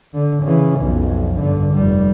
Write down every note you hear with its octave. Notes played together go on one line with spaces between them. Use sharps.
D3
C#3 E3
B1 F2
G2 D3
F1 G3